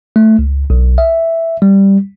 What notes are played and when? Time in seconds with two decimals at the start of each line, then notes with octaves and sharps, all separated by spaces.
0.16 A3
0.39 C#2
0.70 B1
0.98 E5
1.62 G3